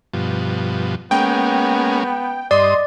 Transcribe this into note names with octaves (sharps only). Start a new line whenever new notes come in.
G2 B2 F3
G#3 A#3 B3 C#4 G5
G2 D5 D#5 C6 D#6